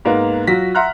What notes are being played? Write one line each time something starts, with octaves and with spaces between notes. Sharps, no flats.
G#2 A#3 B3
F#3 F4 F#4 A#6 B6
E5 F#5 A#5 C6 F6 F#6